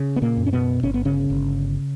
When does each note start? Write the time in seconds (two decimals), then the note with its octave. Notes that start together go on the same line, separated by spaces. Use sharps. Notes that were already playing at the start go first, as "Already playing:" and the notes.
Already playing: C#3
0.16 B3
0.22 A#2 A#3
0.37 F#2
0.47 C#4
0.53 B2 B3
0.83 G1 C#4
0.94 B3
1.05 C#3 C#4
1.30 G1